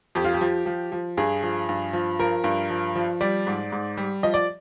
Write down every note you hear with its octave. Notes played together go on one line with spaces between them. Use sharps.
F2 G4
F4
G4
F3
F3
F3
G2 G#4
F3
G2
F3
F3 A#4
G2
F3
F3
G3 D5
G#2
G#2
G3
F3 D#5
D5